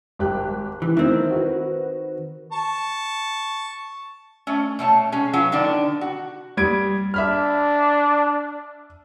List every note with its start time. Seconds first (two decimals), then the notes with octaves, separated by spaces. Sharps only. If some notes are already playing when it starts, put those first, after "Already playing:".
0.19 G#1 G4 F#6
0.82 E3
0.97 D#3 A3 C4 E4
1.31 F#4 B4
2.52 A5 C#6
4.47 A3 C#4
4.79 B2 A3 C#5 A5
5.12 G#3 C#4 G#4
5.33 F#3 B3 C#4 F4
5.52 D3 D#3 B3 D4
6.01 F#4
6.57 G3 G#6 D7
7.14 D4 E5 B5 F6